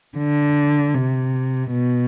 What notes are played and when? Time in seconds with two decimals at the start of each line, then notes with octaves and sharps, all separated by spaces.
0.18 D3
0.95 C3
1.71 B2